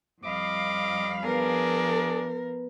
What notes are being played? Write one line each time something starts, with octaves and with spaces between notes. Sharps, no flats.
F2 G3 D#5 F5 B5 D6
F3 B3 D4 G#4 A#4 B4